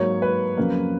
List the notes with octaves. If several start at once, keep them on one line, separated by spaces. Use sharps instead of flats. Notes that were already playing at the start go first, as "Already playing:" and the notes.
Already playing: G#2 F#3 A#3 C#5
B4
F2 C#3 F#3 A#3